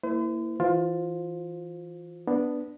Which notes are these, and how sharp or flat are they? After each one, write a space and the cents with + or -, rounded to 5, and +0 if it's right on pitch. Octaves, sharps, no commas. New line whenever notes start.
A#3 -15 E4 +0 C5 -45
E3 +0 F4 +20 C5 +0
B3 +0 D4 +0